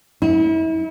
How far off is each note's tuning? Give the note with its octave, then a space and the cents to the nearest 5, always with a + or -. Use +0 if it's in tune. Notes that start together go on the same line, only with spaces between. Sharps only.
E4 -35